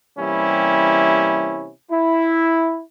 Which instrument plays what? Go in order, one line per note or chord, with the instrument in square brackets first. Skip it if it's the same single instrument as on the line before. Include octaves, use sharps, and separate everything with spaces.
[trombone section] C3 E3 G3 A#3 C#4 E4
E4